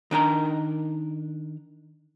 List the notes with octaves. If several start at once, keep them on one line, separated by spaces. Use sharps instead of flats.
D#3 D4 A#4 A#5